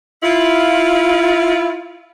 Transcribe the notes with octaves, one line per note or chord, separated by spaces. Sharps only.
E4 F4